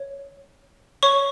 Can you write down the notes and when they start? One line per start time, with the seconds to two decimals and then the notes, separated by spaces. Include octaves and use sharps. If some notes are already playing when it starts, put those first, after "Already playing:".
Already playing: C#5
1.03 C#5 C#6